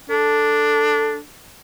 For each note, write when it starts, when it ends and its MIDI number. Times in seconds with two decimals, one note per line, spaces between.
0.10 1.23 62
0.10 1.17 69